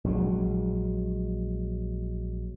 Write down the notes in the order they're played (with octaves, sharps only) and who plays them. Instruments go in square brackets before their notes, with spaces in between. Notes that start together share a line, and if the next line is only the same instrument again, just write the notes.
[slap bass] A#1 F#3 G#3